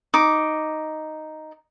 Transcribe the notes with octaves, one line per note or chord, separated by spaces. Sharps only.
D#4 D6